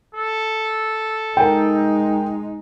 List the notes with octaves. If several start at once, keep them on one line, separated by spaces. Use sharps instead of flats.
A4
G#3 D#4 A#4 G5